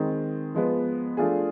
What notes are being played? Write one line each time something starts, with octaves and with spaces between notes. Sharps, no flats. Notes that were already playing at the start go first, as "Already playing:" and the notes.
Already playing: D#3 G#3 C4
F3 G#3 B3
F3 A3 D4 F4 G#4